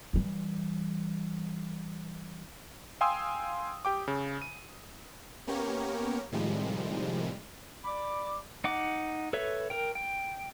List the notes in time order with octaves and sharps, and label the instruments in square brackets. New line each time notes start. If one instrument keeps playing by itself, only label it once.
[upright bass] E3 G3
[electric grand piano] F5 G5 G#5 C6 D#6 E6
G4 G5 D6
C#3
D#7
[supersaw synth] A#3 B3 C#4 G4 A#4 C#5
A2 C3 D#3 F3 G3 G#3
[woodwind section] D5 B5 D6
[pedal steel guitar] D#4 F#5 D6
A4 B4 C#5 E5
A#4 G5
G5